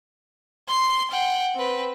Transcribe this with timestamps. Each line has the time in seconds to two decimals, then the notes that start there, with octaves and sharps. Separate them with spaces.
0.68 C6 C7
1.11 F#5 G5
1.55 C4 B4